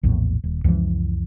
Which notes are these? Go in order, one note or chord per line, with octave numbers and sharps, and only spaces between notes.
A#1 E2 A2
D#1
C#2 F#2 E3 F3